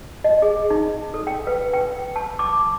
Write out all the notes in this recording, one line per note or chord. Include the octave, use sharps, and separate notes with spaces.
D#5
G#4
D#4
A4
G5
B4
G5
A5
D6